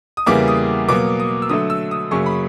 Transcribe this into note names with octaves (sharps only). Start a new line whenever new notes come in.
D#6
E2 C#3 E3 G3 A#3 D6
D#6
B2 F#3 A#3 D6
D#6
E6
D3 F#3 A3 D#6
E6
D#6
F#2 C#3 F#3 A#3 C#6
B5